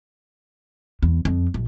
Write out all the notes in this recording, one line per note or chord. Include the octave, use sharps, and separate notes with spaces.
E2
F2
A#1